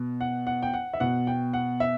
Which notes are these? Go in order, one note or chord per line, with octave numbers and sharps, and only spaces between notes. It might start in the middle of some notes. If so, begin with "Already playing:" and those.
Already playing: B2
F#5
F#5
G5
F#5
E5
B2 F#5
G5
F#5
E5